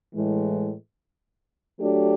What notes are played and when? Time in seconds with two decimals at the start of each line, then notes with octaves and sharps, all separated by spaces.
0.14 A2 E3 G#3
1.79 F#3 A3 D4 G4